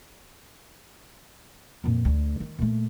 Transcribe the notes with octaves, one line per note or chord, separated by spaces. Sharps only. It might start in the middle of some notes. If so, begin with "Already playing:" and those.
F2 A#2
D2
D#3
A#2 A3